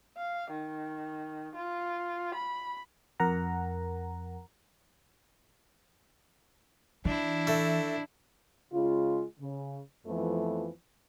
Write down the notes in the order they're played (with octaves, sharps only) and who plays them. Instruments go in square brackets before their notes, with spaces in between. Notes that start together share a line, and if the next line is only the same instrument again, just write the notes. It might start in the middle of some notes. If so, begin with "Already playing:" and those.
[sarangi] F5
D#3
F4
B5
[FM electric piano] F2 A#4 F#5 A#5
[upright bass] E3 [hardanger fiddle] D4 E4
[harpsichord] A3
[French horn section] C#3 G#3 F4
C#3
F2 E3 F3 A3 B3